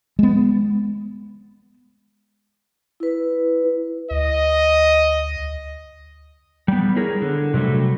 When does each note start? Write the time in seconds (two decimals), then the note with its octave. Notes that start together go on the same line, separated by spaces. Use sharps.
0.19 G#3 B3
3.00 E4 B4
4.11 D2 D#5
6.68 G3 B3
6.96 E4 G#4 A#4 C#5
7.22 D3
7.54 C3 F#3 G3 A3